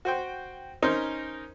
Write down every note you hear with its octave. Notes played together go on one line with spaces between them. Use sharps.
F#4 C5 G5
C#4 D#4 A#4 C5